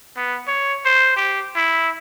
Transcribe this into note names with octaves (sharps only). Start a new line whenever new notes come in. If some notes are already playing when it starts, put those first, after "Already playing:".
B3
C#5
C5
G4
E4